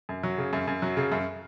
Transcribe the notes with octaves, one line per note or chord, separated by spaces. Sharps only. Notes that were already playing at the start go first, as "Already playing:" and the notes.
F#2
F#3
C#3
F#2
F#2
F#3
C#3
F#2